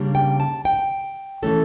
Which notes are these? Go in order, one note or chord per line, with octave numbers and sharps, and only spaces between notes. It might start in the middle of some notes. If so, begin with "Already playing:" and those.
Already playing: C#3 G3 A#3 D4
G5
A5
G5
E3 A3 C#4 A4